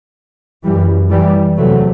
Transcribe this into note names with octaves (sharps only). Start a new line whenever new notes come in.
F#2 E3 G3
E3 G3
E2 C3 F#3 A3